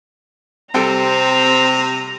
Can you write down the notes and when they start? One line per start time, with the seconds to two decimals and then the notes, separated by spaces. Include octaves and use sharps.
0.74 C3 G3 C4 A4 G5 A#5